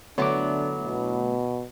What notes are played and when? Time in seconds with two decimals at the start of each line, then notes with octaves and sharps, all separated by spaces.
0.18 D3 F#3 A3 B3 D4 E4 C#5 D6
0.84 B2